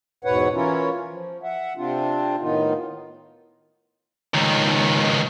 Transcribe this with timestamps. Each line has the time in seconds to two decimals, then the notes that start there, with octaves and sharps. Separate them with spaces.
0.25 E2 G#2 B2 B4 C#5 F#5
0.54 E3 C#4 E4 F4 A#4 C#5
1.09 F3
1.43 E5 F#5
1.77 C3 C4 D4 F4
2.40 A2 D#3 B3 D#4 F4
4.34 C#2 D#3